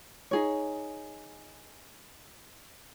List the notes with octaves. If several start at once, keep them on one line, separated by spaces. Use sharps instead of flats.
D#4 G#4 C#5